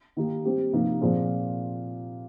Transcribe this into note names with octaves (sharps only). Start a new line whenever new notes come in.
D#3 A#3 D#4 G4
G3 C4 G4
C3 F3 A#3 D#4
A#2 F3 C4 F4 G#4